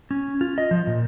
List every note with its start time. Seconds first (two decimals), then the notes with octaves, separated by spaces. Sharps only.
0.11 C#4
0.41 F4
0.58 D#5
0.71 F3
0.87 A#2